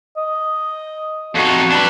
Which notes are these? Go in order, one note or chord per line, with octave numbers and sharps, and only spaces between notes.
D#5
F2 D#4 F#4
D4 B4